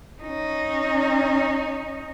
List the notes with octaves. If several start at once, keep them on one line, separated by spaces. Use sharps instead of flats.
C#4 D#4